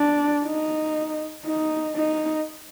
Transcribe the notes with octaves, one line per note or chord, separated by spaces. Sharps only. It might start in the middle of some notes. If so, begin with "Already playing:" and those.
Already playing: D4
D#4
D#4
D#4